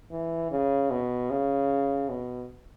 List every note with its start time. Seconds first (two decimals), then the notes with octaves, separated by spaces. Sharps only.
0.11 E3
0.51 C#3
0.90 B2
1.30 C#3
2.09 B2